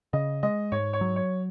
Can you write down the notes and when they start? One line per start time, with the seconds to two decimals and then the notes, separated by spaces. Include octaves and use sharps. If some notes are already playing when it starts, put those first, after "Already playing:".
0.13 C#3 D#5
0.43 G#3 D#5
0.72 G#2 C#5
0.93 C#5
1.01 F#3
1.16 C#5